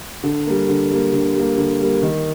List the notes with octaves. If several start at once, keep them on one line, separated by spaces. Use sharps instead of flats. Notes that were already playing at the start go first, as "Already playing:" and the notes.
D3
G3 A#3
D3
G3 A#3
D3
G3 A#3
D3
G3 A#3
D#3